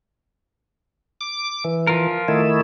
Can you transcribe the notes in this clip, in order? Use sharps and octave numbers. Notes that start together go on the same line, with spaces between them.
D6
E3
F3 F4 A#4
D#3 A3 E4